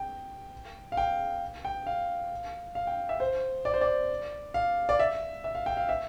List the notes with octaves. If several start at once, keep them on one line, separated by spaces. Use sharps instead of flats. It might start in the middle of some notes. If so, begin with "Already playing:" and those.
Already playing: G5
F5
G5
G5
F5
F5
G5
E5
C5
D5
C5
D5
F5
D5
E5
E5
F5
G5
F5
E5